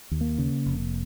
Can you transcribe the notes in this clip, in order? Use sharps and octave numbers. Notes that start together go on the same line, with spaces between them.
D#2
A#3
C#3
F1